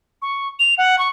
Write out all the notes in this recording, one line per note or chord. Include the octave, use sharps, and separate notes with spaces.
C#6
F7
F#5
C#6